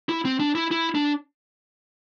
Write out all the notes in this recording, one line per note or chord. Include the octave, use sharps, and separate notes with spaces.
E4
C4
D4
E4
E4
D4